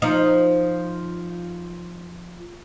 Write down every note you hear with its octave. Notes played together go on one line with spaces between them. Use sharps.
F3 D#4